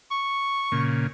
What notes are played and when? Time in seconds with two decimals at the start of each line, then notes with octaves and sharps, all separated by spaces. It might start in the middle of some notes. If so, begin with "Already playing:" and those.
0.11 C#6
0.72 A#2 C#3